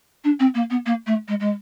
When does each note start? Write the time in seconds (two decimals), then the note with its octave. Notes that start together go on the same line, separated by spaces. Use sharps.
0.24 D4
0.40 C4
0.54 A#3
0.70 B3
0.86 A#3
1.07 A3
1.28 G#3
1.40 G#3